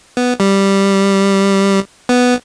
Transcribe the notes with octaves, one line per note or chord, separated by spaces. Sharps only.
B3
G3
B3